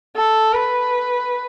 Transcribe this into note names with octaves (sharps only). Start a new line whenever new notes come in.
A4
B4